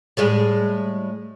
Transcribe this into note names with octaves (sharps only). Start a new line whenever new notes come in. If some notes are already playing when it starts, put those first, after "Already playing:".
A2 G3 G#3